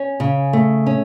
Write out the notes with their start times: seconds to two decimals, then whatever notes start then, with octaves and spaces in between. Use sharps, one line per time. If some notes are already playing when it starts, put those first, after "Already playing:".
Already playing: C#4
0.20 C#3
0.53 A3
0.86 C#4